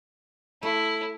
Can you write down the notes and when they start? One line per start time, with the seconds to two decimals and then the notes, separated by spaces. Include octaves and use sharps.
0.63 A3 E4